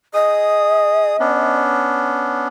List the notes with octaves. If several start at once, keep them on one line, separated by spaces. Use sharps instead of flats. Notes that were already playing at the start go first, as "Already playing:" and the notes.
G#4 D#5 D#6
B3 C#4 D4